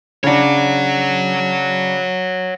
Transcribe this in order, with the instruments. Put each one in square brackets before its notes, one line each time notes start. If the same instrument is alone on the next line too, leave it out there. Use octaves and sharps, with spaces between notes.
[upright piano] C#3 D4 [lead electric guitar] C#5 F#5